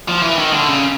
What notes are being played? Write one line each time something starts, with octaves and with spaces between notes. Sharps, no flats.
F3
E3
D#3
D3
C#3